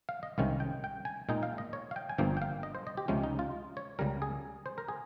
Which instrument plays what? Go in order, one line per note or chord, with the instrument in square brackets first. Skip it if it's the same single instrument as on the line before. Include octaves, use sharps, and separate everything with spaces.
[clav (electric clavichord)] F5
D#5
C2 C3 D#3 G#3 C#4 F5
G5
G5
G#5
A#2 G#3 D#4 G5
F5
D#5
C#5
F5
G5
G#5
G1 G2 F3 A#3 G5
G5
F5
D#5
C5
D#5
G4
C#2 C3 F3 G#3 C#4
D#4
F4
C#5
C#2 C#3 G3 A#4
G#4
C5
A#4
G#4